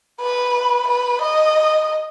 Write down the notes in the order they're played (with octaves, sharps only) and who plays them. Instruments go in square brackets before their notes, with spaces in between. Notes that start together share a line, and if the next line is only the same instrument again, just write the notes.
[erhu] B4
B4
D#5